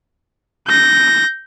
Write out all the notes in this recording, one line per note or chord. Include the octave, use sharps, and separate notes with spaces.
G6 A#6